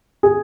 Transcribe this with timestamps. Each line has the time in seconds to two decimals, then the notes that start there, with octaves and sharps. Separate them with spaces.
0.23 G#4